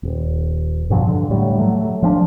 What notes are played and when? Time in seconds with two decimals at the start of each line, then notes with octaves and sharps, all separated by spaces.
0.03 D#1
0.90 G2 B2 F3 F#3
1.07 D3
1.30 A2 F#3 G3
1.59 F#3 A3
2.03 F3 C4 D4